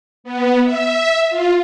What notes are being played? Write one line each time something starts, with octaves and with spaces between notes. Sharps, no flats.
B3
E5
F4